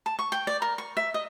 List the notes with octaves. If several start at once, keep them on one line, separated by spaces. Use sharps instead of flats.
A5
C#6
G5
D5
A#4
C#6
E5
D#5